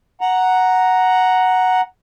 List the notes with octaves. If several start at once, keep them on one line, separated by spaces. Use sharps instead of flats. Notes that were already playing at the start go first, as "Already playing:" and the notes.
F#5 A#5